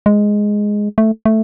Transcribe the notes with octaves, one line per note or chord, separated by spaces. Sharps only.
G#3
A3
A3